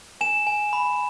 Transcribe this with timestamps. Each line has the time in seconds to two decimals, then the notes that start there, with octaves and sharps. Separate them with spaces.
0.21 G#5 E7
0.47 G#5
0.73 B5